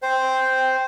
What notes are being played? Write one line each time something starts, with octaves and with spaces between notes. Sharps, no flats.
C5 G5